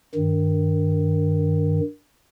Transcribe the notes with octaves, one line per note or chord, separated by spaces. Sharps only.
G2 D#3